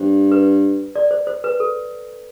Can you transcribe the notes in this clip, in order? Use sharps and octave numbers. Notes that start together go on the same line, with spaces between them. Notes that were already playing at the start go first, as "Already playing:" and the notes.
Already playing: G2 C5
B4
D5
C5
C5
B4
A4